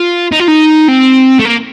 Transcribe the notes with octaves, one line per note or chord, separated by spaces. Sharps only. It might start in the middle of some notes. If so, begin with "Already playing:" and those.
Already playing: F4
D#4
F4
D#4
C4
A3
A#3